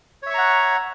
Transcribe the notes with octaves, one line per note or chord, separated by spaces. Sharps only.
C#5 E5 F#5 A#5 C#6